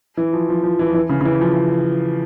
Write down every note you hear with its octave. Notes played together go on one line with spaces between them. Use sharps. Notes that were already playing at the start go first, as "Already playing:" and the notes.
E3
F3
F3
F3
E3
F3
E3
C#3
C#3
E3
F3